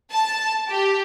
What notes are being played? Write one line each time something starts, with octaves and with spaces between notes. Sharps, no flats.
A5
G4